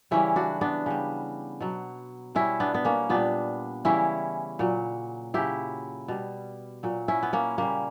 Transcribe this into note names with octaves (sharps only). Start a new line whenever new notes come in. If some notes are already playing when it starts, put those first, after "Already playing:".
C#3 E3 G3 C#4 E4
D4 F#4
B3 D4
C#3 G3
B2 F#3
B2 G3 C#4 E4
B3 D4
B3
A#3 C#4
A#2 G3 B3 D4
C#3 E3 G3 C#4 E4
A#2 F#3
C#3 F#3 E4 G4
B2 G3
A#2 F#3
C#4 E4
B3
A#3 C#4
C#3 G3 A#3